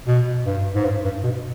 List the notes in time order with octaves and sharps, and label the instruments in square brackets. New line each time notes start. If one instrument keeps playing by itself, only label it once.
[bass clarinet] B2
G2
G#2
G2
G2
B2